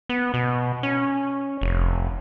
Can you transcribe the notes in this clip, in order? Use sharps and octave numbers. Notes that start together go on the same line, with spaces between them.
B3
B2
C#4
F1